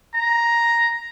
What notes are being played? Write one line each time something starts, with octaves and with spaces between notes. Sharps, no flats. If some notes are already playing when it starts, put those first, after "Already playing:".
A#5